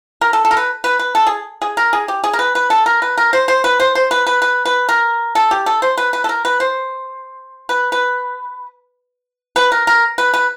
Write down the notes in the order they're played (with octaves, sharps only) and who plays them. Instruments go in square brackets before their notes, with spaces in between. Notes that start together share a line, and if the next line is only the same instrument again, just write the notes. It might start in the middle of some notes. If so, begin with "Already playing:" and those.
[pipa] A#4
A4
A4
A#4
B4
B4
B4
A4
G#4
G#4
A#4
G#4
G4
G#4
A#4
B4
B4
A4
A#4
B4
A#4
C5
C5
B4
C5
C5
B4
B4
B4
B4
A#4
A4
G4
A4
C5
B4
B4
A4
A#4
B4
C5
B4
B4
B4
A#4
A#4
B4
B4